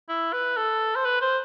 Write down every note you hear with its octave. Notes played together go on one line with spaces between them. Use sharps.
E4
B4
A4
C5
B4
C5